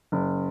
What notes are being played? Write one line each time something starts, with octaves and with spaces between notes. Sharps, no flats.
F#1